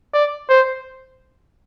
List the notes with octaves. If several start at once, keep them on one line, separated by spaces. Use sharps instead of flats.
D5
C5